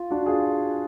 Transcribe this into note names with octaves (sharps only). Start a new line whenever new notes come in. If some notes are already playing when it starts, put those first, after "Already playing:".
Already playing: F4
D4 F#4
F4 G#4